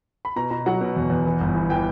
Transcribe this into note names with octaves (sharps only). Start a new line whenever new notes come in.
B5
B2 A#5
B2 A#5
F#3 F#5
B2
E2
E2
E3
G1
E3
E3 G5